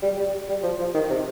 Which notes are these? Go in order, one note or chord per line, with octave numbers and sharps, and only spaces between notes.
G3
G3
G3
F3
F3
D#3
C3